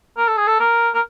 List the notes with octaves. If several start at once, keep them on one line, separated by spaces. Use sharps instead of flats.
A#4
A4
G#4
A4
A#4
A#4